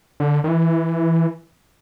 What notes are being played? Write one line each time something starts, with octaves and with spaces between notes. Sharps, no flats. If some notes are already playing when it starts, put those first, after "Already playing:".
D3
D#3
E3